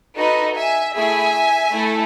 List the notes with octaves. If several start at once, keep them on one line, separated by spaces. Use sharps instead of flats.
D#4 F#4 A4 B4 D#5
E5 G#5
A3 E4 G#4 E5 G#5
A3 E4 A4